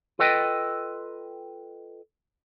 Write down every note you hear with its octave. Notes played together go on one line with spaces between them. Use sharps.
F4 A4 B4 D#5 G5